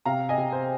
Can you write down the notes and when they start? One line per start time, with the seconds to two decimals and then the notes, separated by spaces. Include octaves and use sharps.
0.05 C3 F5 A#5
0.29 D#5 G#5
0.38 C3
0.52 C5